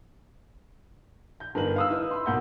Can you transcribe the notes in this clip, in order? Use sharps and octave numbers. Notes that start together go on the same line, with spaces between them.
G6
G1 D#3 A#4 B4 F#7
F5 D#6 E6
D#4 E4 B4
B5 C6
B1 A#3 F#5 G6